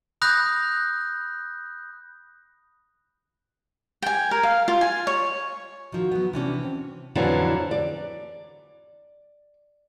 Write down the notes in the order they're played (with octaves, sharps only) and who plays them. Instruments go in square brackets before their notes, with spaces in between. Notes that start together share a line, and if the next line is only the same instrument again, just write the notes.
[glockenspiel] B5 D#6 F#6 G6 A#6
[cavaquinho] G5 G#5
A#4
F5
F4
G#5
C#5
[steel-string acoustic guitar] D#3 F3 [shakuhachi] F#4
[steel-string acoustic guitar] F#3 B3
[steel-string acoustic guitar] C3 E3 C#4 [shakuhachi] D4
[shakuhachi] C4
[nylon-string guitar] F2 D3 E3 F#3
D5